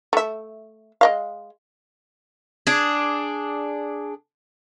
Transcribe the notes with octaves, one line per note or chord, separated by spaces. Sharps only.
A3 E5
G#3 D#5 F5
D4 G#4